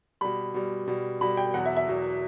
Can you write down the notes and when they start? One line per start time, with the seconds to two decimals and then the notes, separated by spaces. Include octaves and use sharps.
0.21 B2 G3 B5
0.54 B2 G3
0.87 B2 G3
1.21 B2 G3 B5
1.37 G5
1.54 E2 B2 F#3 F#5
1.66 E5
1.77 E5
1.87 E2 B2 F#3